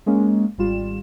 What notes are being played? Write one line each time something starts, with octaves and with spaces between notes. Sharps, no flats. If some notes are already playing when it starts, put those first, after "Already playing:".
G#3 A#3 C#4
G#1 G3 F4 E7